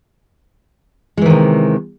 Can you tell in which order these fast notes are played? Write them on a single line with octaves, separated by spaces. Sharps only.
G#3 E3 D#3 C3